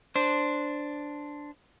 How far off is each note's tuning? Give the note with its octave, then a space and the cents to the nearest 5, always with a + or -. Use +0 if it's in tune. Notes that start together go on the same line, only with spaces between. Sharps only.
D4 +0 C5 +0